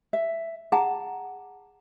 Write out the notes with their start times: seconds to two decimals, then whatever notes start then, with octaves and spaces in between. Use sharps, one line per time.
0.13 E5
0.72 G#4 F#5 A5 A#5